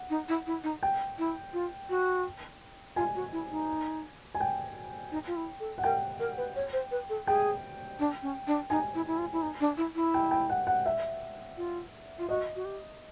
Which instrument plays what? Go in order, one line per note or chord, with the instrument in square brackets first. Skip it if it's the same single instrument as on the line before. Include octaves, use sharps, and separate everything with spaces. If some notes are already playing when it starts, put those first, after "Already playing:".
Already playing: [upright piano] F#5
[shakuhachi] D#4
E4
E4
D#4
[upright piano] G5
[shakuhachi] E4
F4
F#4
[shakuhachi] F4 [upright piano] G#5
[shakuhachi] F#4
E4
D#4
[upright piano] G#5
G5
[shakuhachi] D#4
F4
E4
A4
[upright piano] F#5
[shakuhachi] A#4 [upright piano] G5
[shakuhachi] A#4
B4
C#5
C5
B4
A4
[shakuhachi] G#4 [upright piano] G5
[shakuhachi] D4
C#4
D4
[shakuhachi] D#4 [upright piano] G#5
[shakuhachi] E4
E4
F4
E4
D#4
D4
E4
E4
[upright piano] G5
G5
F#5
F#5
E5
[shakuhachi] F4
F4
[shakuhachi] F#4 [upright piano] D#5
[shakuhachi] F#4
G4